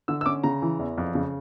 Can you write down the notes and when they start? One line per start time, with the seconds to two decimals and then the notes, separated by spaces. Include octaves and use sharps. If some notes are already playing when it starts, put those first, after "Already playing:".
0.08 D3 E6
0.21 E6
0.26 C#4 D6
0.43 C#3 A#5
0.62 E3
0.79 E2
0.98 F2
1.15 C#3